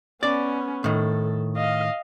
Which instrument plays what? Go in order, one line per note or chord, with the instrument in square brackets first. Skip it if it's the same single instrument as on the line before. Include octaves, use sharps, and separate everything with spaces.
[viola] B3 C#4 [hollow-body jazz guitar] D5
[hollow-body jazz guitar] A2 D#3 [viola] A4
[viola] D#5 F5